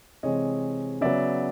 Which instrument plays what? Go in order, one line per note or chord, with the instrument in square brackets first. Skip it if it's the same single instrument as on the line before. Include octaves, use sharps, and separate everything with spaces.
[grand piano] C3 E3 G#3 C4 C#5 D#5
C#3 F#3 B3 D5 E5